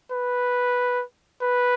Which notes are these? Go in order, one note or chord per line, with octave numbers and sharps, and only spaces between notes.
B4
B4